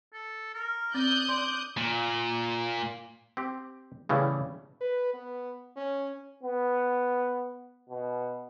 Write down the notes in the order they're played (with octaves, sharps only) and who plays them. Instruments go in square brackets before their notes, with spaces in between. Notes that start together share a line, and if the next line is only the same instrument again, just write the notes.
[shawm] A4
A#4
[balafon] C4 [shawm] D5 [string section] D#6 F#6 G6
[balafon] D5 C6 [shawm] D6
[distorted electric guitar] A#2
[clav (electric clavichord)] C4 G4
A2 C#3 E3 G3 E4
[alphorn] B4
B3
C#4
[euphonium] B3
B2